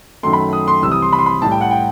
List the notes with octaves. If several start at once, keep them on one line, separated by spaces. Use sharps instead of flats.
F#2 D#3 F#3 A3 C6
B5
D#6
C6
C2 C3 E3 G3 E6
D#6
C6
B5
C6
B5
A2 G3 A5
G5
F#5
G5